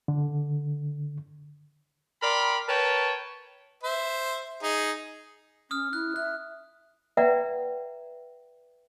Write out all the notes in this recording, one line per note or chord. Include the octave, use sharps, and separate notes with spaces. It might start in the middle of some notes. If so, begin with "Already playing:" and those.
D3
A#4 D5 G5 B5 C6
A#4 B4 C#5 G5 A5
C5 E5
D#4 G#4
C#4 D#6 F6
E4 F#6
E5 F#6
B4 D5 E5 F#5 G5 A#5